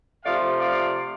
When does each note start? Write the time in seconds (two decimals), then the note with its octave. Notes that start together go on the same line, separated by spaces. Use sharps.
0.24 C3 F3 A3 D5 F5
0.60 D5 F5